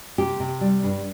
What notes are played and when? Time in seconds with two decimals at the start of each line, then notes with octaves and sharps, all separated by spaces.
0.18 C3 G4
0.40 C3
0.61 G3
0.83 G2